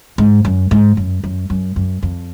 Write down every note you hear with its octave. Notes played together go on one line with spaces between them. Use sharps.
G#2
F#2
G#2
F#2
F#2
F#2
F#2
F2